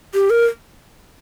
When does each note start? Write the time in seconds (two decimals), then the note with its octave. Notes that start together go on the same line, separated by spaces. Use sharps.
0.14 G4
0.30 A#4